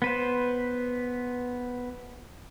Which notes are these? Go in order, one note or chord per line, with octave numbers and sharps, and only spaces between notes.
B3 B4 C5